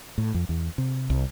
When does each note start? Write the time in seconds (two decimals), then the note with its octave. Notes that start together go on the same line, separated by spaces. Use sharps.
0.18 A2
0.34 F2
0.49 E2
0.78 C3
1.10 C2